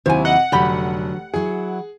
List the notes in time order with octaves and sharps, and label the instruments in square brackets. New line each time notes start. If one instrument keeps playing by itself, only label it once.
[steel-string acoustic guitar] D#2 F#3 E4 [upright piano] C3 F#4 [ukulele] C5 G#5
[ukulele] D#5 [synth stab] F#5
[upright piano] F1 [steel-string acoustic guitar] D3 F#3 [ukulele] G4 D5 B5
[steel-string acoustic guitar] F#3 E4 [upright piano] G#4